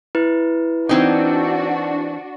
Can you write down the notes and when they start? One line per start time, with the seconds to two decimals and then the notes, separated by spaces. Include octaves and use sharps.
0.15 E4 B4
0.89 E3 C4 D4 D#4 F#4